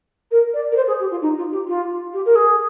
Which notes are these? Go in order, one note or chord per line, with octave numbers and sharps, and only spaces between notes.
A#4
D5
A#4
C5
G#4
G4
F4
D#4
F4
G4
F4
G4
A#4
G#4